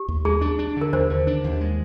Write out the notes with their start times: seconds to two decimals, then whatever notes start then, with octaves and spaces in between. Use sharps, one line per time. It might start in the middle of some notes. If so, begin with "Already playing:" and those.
Already playing: G4
0.08 D#2
0.25 G#3 G#4
0.41 D4
0.59 D4
0.77 D3 A#4
0.93 D#2 C5
1.10 D3
1.27 D4
1.44 D#2
1.61 G#3